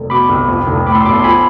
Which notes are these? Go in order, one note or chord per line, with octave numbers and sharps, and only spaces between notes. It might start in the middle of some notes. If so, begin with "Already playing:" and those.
Already playing: F1
B2 B5 D6
C2
F2
F1
A2 B5 D6
C6 E6
B1 B5 D6
A5 C6
F3 G#5 B5